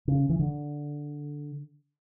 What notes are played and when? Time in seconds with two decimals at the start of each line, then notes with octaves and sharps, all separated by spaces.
0.08 C#3
0.29 E3
0.39 D3